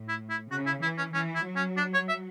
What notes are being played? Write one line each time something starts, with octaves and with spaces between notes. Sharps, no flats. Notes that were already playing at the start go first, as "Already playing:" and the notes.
Already playing: A2
E4
E4
C#3 F#4
E4
E3 E4
C#4
E3 C#4
E4
F#3
C#4
D4
C#5
E5